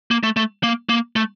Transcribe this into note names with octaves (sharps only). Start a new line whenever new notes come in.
A#3
A3
A3
A#3
A#3
A3